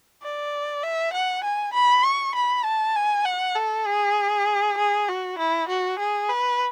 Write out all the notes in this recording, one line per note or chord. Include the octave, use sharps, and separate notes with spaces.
D5
E5
F#5
G#5
B5
C#6
B5
A5
G#5
F#5
A4
G#4
G#4
F#4
E4
F#4
G#4
B4